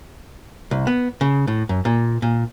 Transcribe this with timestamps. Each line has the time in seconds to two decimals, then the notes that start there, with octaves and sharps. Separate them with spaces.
0.71 C2
0.87 B3
1.21 C#3
1.47 A2
1.69 F#2
1.85 A#2
2.22 A#2